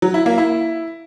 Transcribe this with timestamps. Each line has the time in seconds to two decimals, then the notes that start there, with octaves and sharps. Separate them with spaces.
0.02 F#3
0.14 E4
0.26 A#3
0.38 E4